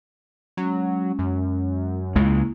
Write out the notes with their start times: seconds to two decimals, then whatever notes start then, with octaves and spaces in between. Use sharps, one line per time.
0.57 F#3 G#3 C#4
1.19 F#2
2.16 C#2 C#3 G#3 A#3 E4